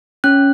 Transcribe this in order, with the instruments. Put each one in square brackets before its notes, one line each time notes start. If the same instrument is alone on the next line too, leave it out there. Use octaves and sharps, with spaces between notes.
[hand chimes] C#4 F#6